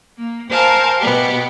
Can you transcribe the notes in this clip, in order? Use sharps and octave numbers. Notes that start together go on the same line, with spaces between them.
A#3
A#4 C5 F5 G#5 A5
B2 B3 G4